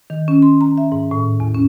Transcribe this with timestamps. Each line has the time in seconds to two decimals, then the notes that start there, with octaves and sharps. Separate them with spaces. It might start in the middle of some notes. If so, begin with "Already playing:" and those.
0.10 D#3
0.28 C#4
0.42 C6
0.61 A#5
0.78 E5
0.92 G#2
1.11 A2
1.40 E2
1.55 C#4